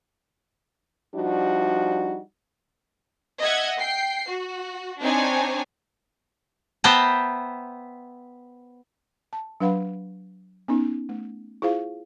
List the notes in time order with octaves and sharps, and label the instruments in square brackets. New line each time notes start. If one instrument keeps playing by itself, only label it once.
[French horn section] F3 G3 D4 D#4 F#4
[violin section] D#5 E5 F#5 G#6
G5 C7
F#4
C4 D4 D#4 C#5 G#5
[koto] B3 C5 E5 G5 A5 A#5
[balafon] A5
F#3 D4 B4 F5 F#5 B5
B3 C#4 D#4
A3
E4 F4 G#4 C5 F5